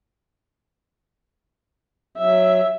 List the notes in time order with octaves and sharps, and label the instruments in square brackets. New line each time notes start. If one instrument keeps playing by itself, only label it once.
[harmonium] F#3 [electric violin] E5